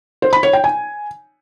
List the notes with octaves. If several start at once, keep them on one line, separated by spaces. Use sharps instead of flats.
C5
B5
C#5
G5
G#5